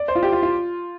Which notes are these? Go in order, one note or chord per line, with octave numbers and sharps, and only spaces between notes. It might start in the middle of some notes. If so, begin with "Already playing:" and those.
Already playing: D5
C5
F4
G4
F4
F4